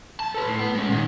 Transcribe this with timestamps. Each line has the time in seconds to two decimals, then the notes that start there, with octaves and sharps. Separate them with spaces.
0.20 B1 A5
0.34 A4 B4
0.48 A2
0.59 B3
0.75 G#3 C#4
0.88 A#2 D#3